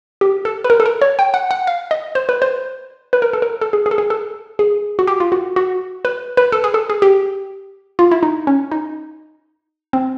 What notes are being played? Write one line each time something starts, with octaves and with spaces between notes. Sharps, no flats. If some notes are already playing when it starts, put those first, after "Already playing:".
G4
A4
B4
A#4
A4
A#4
C#5
G5
F#5
F#5
F5
D#5
C5
B4
C5
B4
A#4
A4
A#4
A4
G#4
G#4
A4
G#4
A4
G#4
F#4
G4
F4
F#4
F#4
B4
B4
A4
G#4
A4
G#4
G4
F4
E4
D#4
C#4
D#4
C4